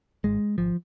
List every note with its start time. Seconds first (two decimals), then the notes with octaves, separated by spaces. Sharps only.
0.24 G#1 G#2 G#3
0.58 G#1 F3